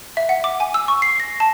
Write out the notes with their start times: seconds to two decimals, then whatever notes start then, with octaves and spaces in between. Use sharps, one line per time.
0.17 E5
0.29 F#5
0.44 D6
0.60 G#5
0.74 E6
0.88 C#6
1.02 C7
1.20 A#6
1.40 A5